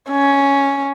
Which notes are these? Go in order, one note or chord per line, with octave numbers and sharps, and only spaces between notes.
C#4